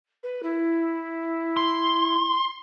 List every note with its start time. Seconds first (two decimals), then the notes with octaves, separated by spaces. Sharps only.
0.23 B4
0.42 E4
1.57 C6